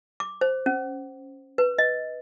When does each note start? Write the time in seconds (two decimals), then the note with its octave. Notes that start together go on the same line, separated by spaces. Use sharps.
0.20 D6
0.41 C5
0.66 C#4
1.58 B4
1.78 D#5